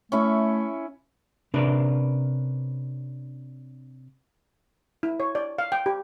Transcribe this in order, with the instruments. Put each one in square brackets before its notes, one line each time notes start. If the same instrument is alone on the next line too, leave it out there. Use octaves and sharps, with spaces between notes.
[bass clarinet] A3 [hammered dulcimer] C#4 E4 C#6
[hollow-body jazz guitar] C3 C#4 D4 A#4 B4
[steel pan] E4
C#5
D5
F5
G5
G4